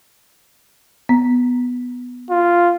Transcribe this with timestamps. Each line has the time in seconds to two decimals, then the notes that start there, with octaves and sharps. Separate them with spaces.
1.09 B3
2.30 F4